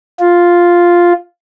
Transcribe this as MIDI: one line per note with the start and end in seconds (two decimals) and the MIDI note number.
0.20 1.13 65